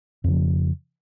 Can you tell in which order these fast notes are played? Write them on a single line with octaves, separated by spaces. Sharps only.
F2 C#3 F3